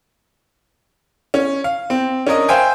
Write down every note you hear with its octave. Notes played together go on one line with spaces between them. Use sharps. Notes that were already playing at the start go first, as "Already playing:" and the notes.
C#4
F5
C4
C#4 D4 A#4 D#5
C5 E5 F5 G5 G#5